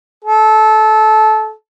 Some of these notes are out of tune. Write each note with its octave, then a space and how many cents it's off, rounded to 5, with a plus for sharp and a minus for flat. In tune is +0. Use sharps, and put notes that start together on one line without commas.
A4 -20